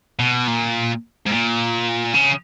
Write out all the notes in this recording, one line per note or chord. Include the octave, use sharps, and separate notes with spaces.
B2
A#2
G#2
A#2
C#3